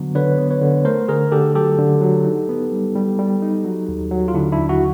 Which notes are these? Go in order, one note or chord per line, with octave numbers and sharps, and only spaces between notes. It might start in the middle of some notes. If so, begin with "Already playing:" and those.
Already playing: D3 F#3 B3
D3 B4 C#5
B3
B4 C#5
D3
A3 A#4 C5
D3 G#4 A#4
D3 G4 A4
F#3 G4 A4
D3
F#3
D#4
B3
G3
G3
G3
D#4
F#3
D#2
F#3
F4
D3 D4 E4
D4 E4
D#2
E4 F#4